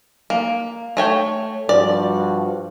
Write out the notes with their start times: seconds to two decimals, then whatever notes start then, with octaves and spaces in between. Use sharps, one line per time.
0.30 A#3
0.97 A3 C#5 G5
1.69 G2 F3 F#4 D5